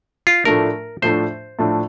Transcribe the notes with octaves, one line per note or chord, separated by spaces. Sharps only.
F4
A2 F3 A3 D4 A#4
A2 F3 A3 D4 C5
A2 F3 A3 D4